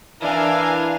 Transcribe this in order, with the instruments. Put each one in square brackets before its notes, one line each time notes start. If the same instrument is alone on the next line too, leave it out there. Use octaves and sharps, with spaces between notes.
[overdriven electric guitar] E3 [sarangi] D4 [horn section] E4 A#4 [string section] F5 G#5